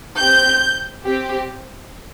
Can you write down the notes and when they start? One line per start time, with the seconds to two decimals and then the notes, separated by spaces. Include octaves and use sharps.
0.17 C4 G4 G6
1.04 C4 G4